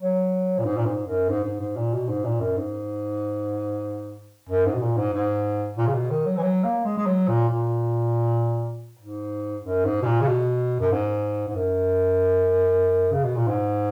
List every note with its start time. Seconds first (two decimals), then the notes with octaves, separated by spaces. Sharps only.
0.01 F#3
0.59 A#2
0.65 G#2
0.78 A#2
0.86 G#2
1.08 F#2
1.29 G#2
1.44 G#2
1.60 G#2
1.77 A#2
1.94 B2
2.09 G#2
2.25 A#2
2.41 F#2
2.57 G#2
4.49 F#2
4.66 G#2
4.75 B2
4.82 A#2
4.97 G#2
5.14 G#2
5.78 A#2
5.87 C#3
5.94 B2
6.11 D#3
6.26 F#3
6.37 E3
6.43 F#3
6.64 A#3
6.85 G#3
6.98 G#3
7.07 F#3
7.28 A#2
7.49 A#2
8.99 G#2
9.64 F#2
9.85 G#2
10.02 B2
10.06 A#2
10.21 C#3
10.28 B2
10.80 F#2
10.92 G#2
11.49 G#2
11.56 F#2
13.13 C#3
13.24 B2
13.36 A#2
13.48 G#2